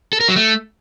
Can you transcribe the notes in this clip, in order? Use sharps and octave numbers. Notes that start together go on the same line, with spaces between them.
A4
A#4
F#3
A3